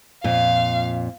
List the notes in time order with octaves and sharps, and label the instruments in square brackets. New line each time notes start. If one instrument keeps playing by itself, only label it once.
[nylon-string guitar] F2 A#2 [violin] F5